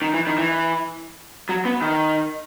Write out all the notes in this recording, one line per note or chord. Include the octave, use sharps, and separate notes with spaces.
D#3
E3
D#3
E3
F#3
B3
D#3